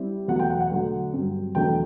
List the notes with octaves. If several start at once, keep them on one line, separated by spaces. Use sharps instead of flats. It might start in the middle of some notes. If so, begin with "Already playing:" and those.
Already playing: G3 C4 E4
E2 B2 F#3 A3 F#5
G5
F#5
F#5
D3 F#3 A3
G2 F#3 C4
E2 B2 F#3 A3 D4 G5